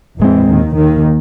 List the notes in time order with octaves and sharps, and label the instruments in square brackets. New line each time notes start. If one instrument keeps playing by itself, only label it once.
[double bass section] E2 E3 [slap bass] A2 G#3 C4
[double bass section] D#2 D#3
D#2 D#3